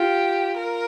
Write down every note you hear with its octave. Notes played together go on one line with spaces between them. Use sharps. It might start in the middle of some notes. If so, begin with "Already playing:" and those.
Already playing: F4 G4
A#4